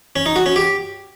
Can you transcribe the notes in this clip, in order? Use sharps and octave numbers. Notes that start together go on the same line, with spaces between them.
C#4
D#4
F#4
C#4
G4